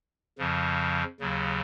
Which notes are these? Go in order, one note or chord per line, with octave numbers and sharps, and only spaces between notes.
F2 C#3 F3
D#2 C#3 F#3